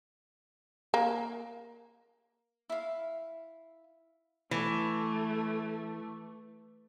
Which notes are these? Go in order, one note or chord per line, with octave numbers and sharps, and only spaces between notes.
A#3
E4 F5
E3 A3